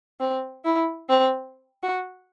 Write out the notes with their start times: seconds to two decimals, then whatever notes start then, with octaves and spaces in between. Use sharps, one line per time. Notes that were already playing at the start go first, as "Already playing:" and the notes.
0.20 C4
0.65 E4
1.09 C4
1.83 F#4